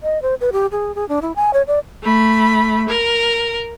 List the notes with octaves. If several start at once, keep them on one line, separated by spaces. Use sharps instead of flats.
D#5
C5
B4
G4
G#4
G#4
D4
E4
G#5
C#5
D5
A3 B5
A#4